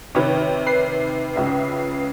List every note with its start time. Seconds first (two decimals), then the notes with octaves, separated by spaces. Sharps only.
0.15 C3 D#3 B4 C#5
0.67 B4 C7
1.36 C#2 C#3 E5